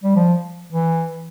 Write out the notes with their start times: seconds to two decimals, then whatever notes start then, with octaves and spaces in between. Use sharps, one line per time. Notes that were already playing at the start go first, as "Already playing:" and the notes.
0.04 G3
0.16 F3
0.73 E3